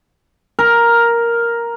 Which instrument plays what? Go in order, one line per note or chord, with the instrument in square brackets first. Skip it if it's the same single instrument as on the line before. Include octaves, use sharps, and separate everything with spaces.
[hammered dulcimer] A#4